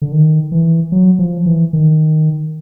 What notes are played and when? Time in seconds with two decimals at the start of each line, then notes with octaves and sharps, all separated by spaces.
0.02 D3
0.12 D#3
0.52 E3
0.92 F#3
1.19 F3
1.46 E3
1.73 D#3